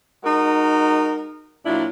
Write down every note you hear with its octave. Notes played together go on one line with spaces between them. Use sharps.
G#3 D#4 F#4 A#4
A#2 F#3 D4 E4 F4